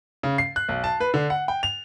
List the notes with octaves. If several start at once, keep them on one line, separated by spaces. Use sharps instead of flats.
C#3
C7
F#6
B1
A5
B4
D3
F#5
G5
F7